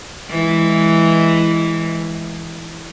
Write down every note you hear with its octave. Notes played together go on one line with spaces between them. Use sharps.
E3 G#3